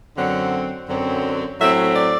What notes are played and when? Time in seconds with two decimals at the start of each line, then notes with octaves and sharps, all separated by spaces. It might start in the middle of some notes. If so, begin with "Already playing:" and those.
0.17 F#2 D3 F#3 C4 F#5
0.88 F#2 D3 F#3 C4
1.60 A2 F#3 A3 C4 E5
1.96 D5